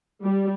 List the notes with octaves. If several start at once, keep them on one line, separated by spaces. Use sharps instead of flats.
G3